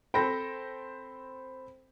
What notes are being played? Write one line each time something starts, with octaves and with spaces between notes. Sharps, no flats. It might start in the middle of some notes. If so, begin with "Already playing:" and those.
C4 A4 C5 G5 B5 A#6